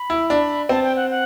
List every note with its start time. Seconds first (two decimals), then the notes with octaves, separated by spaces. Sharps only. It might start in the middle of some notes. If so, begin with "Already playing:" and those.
Already playing: B5
0.10 E4
0.30 D4
0.69 C4 A5
0.83 G5
0.96 F#5
1.10 F#5